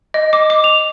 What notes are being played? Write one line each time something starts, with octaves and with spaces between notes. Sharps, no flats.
D#5
D6
D6
F7